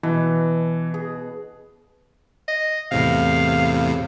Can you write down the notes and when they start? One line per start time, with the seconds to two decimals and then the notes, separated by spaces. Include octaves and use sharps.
0.03 B2 E3
0.94 G#4
2.48 D#5
2.91 E2 A2 C3 F5